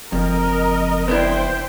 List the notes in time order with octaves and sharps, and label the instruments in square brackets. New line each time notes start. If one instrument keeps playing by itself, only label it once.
[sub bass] F#1 [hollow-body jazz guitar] F2 [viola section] A#4 D#5
[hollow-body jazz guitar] B3 D4 E4 [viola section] C5 G5